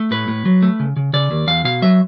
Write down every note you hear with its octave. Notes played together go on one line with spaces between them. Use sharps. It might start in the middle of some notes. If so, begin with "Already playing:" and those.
Already playing: A3
A2 B4
A2
F#3
A3
C#3
C#3
C#3 D5
D#2
E2 F5
B2 F5
F#3 E5